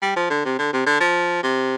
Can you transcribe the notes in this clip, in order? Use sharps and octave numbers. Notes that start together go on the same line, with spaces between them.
G3
F3
D3
C3
D3
C3
D3
F3
C3